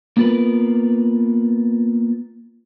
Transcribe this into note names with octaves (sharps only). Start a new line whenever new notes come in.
A#3 B3 F4 A#4 B4